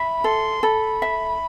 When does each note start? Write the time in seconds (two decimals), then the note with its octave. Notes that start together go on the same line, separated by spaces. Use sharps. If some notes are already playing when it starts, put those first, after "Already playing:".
Already playing: E5 B5
0.24 A4 C6
0.63 A4 B5
1.02 E5